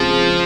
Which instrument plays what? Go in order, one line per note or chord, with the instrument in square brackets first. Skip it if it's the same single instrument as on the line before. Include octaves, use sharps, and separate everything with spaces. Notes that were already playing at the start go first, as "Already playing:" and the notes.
Already playing: [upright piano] C#3 G#3 C4 [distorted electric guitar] F3